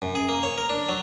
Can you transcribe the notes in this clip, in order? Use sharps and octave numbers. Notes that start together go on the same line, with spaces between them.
F#2
G#4
A#3
C#5
A#4
D4
F#3